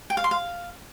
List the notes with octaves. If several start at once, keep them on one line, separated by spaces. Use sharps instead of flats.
G5
F5
C6
F5